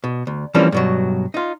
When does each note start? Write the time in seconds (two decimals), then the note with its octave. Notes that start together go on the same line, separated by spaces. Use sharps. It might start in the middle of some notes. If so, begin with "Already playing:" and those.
0.04 B2
0.27 D2
0.54 E3 F3 G3 A#3 C4 C#4
0.72 G2 B2 F#3
1.34 D#4 F4